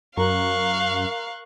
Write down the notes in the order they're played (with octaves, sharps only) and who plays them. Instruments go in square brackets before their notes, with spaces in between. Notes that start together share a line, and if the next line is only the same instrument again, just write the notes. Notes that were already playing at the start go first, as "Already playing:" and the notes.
[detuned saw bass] F#2 [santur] A#4 [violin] F5 [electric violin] C#6 F#6